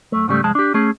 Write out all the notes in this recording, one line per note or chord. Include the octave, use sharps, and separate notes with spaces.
F#2 A3
G#2 C#3 G3 A3
C2 F2 G#3 A5
D4 G4
A3 C#4 G#4